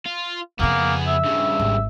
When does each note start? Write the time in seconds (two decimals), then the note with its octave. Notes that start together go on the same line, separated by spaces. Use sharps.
0.06 F4
0.60 F2 C#3 A#3 B3 G#4
1.07 E5
1.25 G2 C#3
1.60 G#1